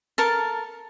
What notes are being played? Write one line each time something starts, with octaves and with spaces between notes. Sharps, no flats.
A4 A#4 A5